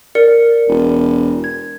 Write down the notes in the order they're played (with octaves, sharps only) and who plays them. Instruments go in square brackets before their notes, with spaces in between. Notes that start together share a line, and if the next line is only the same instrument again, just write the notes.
[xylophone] A#4 D5 C#7
[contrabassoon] E1
[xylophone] G#6